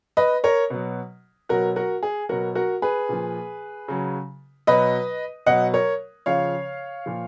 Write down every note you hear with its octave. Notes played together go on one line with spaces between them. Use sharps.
B4 D#5
A#4 C#5
B2 F#3
B2 F#3 F#4 A#4
F#4 A#4
G#4
B2 F#3 F#4 A#4
F#4 A#4
G#4 B4
A#2 F3
C#3 F#3
B2 F#3 B4 D#5
B2 F#3 D#5 F#5
A#4 C#5
C#3 F3 C#5 F5
A#2 F3